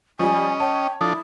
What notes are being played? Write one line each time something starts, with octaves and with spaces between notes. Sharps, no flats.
F3 G3 C#4 D#5 G#5
C#5 G5 A5
F3 D4 E4 A4 D#6